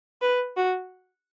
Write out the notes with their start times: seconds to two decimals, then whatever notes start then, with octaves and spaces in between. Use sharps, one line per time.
0.22 B4
0.57 F#4